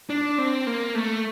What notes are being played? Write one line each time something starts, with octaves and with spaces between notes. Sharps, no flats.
D4
C4
A#3
A3